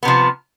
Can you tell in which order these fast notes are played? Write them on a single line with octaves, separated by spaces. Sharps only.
B3 C3 F3